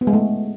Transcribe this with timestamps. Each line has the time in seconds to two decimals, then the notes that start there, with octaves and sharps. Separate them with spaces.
0.01 B3
0.07 G#3
0.13 A3